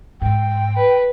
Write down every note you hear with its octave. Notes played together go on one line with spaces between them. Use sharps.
G#2 G5
B4